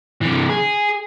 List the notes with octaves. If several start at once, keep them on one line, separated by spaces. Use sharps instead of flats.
C3 E3
G#4